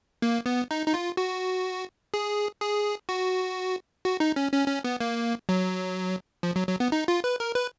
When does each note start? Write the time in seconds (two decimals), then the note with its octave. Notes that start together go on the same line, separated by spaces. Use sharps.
0.22 A#3
0.46 B3
0.71 D#4
0.87 D#4
0.94 F4
1.17 F#4
2.14 G#4
2.61 G#4
3.09 F#4
4.05 F#4
4.20 D#4
4.36 C#4
4.53 C#4
4.68 C#4
4.84 B3
5.00 A#3
5.49 F#3
6.43 F3
6.56 F#3
6.67 F#3
6.80 B3
6.92 D#4
7.08 F4
7.24 B4
7.40 A#4
7.55 B4